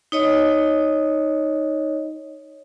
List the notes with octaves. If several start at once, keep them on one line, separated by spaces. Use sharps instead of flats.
D#4 C#5 D#5